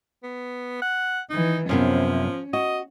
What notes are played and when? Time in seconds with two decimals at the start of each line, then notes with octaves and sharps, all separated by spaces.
0.23 B3
0.82 F#5
1.30 D#3 E3 D#4
1.69 F#2 C3 F3 B3 C#4
2.53 F#4 D#5